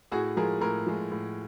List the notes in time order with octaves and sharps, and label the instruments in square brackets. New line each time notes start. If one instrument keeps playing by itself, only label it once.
[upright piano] A2 F#4 G#4
F3 G#3 G#4 A#4
A2 G#4 A#4
F3 G#3
A2